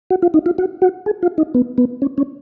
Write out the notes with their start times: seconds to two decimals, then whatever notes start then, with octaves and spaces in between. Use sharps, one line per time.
0.10 F#4
0.22 F4
0.34 D#4
0.46 F4
0.58 F#4
0.82 F#4
1.06 G#4
1.23 F4
1.38 D#4
1.54 B3
1.78 B3
2.02 C#4
2.18 C#4